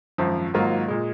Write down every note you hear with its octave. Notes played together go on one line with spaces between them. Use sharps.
G#1 F#2 F3
G#1 G#2 F#3 A#3 F4
A#2 G#3